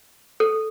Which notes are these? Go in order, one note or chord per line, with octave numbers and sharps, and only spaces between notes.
A4